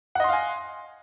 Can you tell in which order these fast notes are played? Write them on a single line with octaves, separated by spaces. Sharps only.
F#5 D#5 C6 F5 G#5